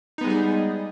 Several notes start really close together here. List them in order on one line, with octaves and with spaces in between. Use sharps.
D#4 B3 G#3 G3 G#4